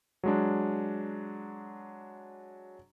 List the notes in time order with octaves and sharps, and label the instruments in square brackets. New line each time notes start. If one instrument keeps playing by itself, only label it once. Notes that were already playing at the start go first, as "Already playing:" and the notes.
[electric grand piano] F#3 G#3 D4